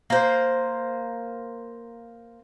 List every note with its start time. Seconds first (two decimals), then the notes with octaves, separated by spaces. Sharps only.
0.10 A#3 C5